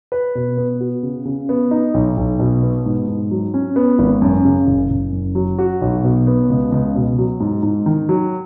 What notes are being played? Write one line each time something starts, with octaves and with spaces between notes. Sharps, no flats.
B4
B2
B3
F#4
C#3
C#3
B3
D#4
B1
B1
B2
B3
G#2
G#2
F#3
C#4
B3
G#1
F#2
C#3
F#1
F#1
F#2
F#3
F#4
B1
B2
B3
C#2
C#2
B2
F#3
G#2
G#2
D#3
F#3